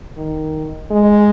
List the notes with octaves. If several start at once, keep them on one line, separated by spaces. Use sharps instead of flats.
D#3
G#3